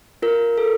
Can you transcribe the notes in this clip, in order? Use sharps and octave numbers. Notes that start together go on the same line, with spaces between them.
F4 A#4
A4